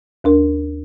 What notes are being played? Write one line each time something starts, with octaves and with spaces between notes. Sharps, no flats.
D#2 D4 A#4